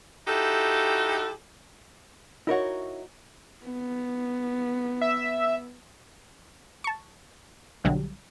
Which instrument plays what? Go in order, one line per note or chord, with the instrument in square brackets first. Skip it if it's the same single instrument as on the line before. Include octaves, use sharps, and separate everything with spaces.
[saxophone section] D#4 E4 F#4 G4 A4
[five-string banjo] D#4 F#4 [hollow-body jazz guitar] E4 A#4 C#5
[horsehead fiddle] B3
[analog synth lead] E5
[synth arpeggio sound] A5 C#6
B1 D3 F#3 G3